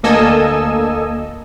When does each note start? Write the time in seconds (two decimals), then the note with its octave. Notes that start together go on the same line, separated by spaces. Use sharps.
0.03 D2 A#3 A4 D#5 G#5 E6